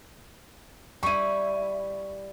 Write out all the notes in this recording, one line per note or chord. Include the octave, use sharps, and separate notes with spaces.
G3 E4 C#6 D#7